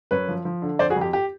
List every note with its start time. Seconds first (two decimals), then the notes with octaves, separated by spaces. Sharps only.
0.11 F#2 B4 C#5
0.28 F3
0.45 F3
0.62 D3
0.79 F2 C5 D5
0.90 F#4 G#4
0.96 F2
1.01 G4
1.13 G4